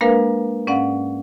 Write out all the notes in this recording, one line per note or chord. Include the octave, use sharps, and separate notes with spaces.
G#3 A#3 D4 A#4 B4 F5
G#2 C#4 D5 F5 F#5